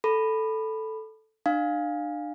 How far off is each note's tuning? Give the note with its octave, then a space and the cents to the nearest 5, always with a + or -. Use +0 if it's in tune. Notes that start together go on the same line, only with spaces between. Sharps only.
A4 +0 B5 +0
D4 +35 F5 +10